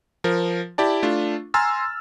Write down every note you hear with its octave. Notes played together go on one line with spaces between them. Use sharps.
F3 A#4
E4 G4 D5 A5
A3 D4 F4
G#5 A#5 C6 E6 F6 A6